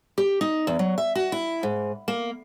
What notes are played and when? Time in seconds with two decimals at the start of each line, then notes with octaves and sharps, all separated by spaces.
0.18 G4
0.41 D#4
0.67 E2
0.79 F#3
0.98 E5
1.15 F#4
1.32 E4
1.63 G#2
2.08 A#3